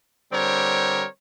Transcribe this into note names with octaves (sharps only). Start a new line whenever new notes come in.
D3 G3 C4 A#4 C#5